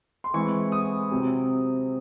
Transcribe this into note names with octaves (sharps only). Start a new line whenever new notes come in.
C6
E3 G#3 C4 E4 C#6
D#6
C3 F#3 C4